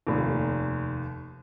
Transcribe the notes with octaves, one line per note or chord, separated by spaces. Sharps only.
F1 D#2